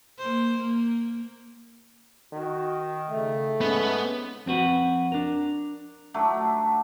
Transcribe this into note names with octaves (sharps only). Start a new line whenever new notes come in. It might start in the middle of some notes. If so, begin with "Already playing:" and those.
A#3 C5
A#3
D#3 F#4
C#3 A3
G#2 B3 C#4
F2 C4 F#4 B4
D4 A#4
F#3 A3 D4